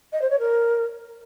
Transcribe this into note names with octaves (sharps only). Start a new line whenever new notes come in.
D#5
C5
C#5
A#4